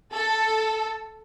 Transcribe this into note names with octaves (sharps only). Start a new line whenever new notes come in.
A4